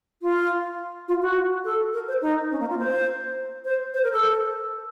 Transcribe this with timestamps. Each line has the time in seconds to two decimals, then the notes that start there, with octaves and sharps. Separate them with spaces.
0.22 F4
1.08 F4
1.22 F#4
1.64 A4
1.93 A#4
2.08 C5
2.21 D#4
2.51 C#4
2.60 A#3
2.69 F4
2.79 C5
3.65 C5
3.94 C5
4.03 A#4
4.12 A4